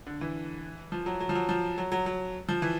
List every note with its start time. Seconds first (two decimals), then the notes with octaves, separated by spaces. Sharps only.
0.07 D3
0.21 E3
0.92 F3
1.06 F#3
1.20 F#3
1.29 F3
1.35 F#3
1.49 F3
1.78 F#3
1.92 F#3
2.06 F#3
2.49 F3
2.62 E3